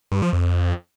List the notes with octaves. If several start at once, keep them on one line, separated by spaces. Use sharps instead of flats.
G2
F3
F2